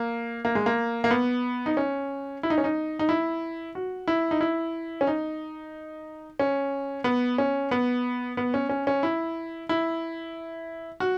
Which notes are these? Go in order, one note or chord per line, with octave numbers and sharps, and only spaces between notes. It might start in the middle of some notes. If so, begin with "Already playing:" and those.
Already playing: A#3
A#3
G#3
A#3
A#3
B3
D#4
C#4
E4
D#4
C#4
D#4
D#4
E4
F#4
E4
D#4
E4
C#4
D#4
C#4
B3
C#4
B3
B3
C#4
C#4
C#4
E4
E4
F#4